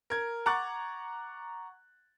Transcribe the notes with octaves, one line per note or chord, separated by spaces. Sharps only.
A#4 G#6
F#5 A#5 C#6 D6 F#6 A6